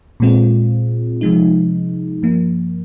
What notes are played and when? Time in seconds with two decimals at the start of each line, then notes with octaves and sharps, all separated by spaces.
0.20 A#2 G#3 C4 F4
1.21 C3 F3 G#3 D#4
2.22 G2 F3 A#3